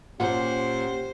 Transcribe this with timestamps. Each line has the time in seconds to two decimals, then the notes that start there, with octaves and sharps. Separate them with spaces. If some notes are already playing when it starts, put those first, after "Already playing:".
0.20 A#2 C#4 G4 C5 F#5